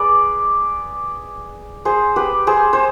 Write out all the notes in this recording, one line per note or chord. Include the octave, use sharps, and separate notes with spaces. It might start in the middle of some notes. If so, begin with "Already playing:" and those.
Already playing: G#4 B4 D5
G#4 C5
G4 B4
G#4 C5
C5